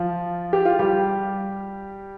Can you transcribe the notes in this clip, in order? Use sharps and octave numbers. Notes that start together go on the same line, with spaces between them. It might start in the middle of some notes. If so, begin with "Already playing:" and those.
Already playing: F3 F4
G4
F4
G3 G4